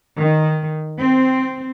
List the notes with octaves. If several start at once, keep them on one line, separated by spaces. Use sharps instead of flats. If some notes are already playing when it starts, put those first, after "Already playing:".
D#3
C4